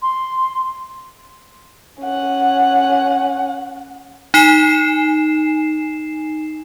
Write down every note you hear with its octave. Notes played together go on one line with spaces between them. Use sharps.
C6
C#4 F#5
D#4 G#5 C7 E7